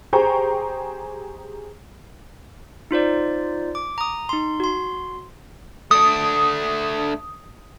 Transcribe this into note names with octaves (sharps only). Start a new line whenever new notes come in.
G4 G#4 C5 G5 A#5 C#6
D#4 F4 C5 D5
D6
A#5 D#6
D#4 C6
F#4 C6
A3 D4 D#6